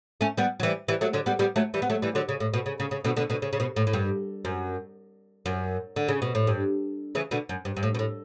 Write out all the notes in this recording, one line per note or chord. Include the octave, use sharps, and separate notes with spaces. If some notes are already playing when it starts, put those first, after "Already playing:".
A3 C#4
G3 B3
F#3
E3 G3
E3 G3
F#3 A3
D3 F#3
G3 B3
G3 B3
F#3 A3
E3 G3
B3
F#3 A3
E3 G3
D3 F#3
C#3
A2
B2
C#3
C#3
C#3
B2 D3
B2 D3
B2 D3
C#3
C#3
B2
A2
A2
G2
F#2
F#2
D3
C#3
B2
A2
G2
C#3 E3
B2 D3
F#2
G2
G2
A2
B2
A2